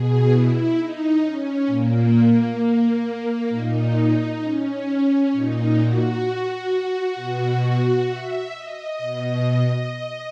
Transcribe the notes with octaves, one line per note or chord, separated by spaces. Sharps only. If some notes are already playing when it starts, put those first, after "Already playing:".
Already playing: B2 G#4
E4
D#4
C#4
A#2 A#3
A#2 D#4
C#4
A#2 D#4
F#4
B2
E5
D#5
B2